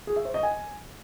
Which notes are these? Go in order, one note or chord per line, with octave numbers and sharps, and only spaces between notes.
G#4
E5
C5
D#5
G#5